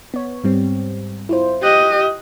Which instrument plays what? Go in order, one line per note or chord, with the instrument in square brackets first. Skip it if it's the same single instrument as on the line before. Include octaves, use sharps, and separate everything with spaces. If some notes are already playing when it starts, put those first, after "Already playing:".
[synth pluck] B3 C#5
G#2 G3 C4
E4 F4 C5
[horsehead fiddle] G4 D#5 [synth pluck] F#6